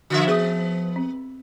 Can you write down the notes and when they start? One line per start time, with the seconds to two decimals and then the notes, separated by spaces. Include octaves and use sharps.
0.10 D3 F3 F4 F#4 E5
0.28 B3 G#4 D#6
0.96 C4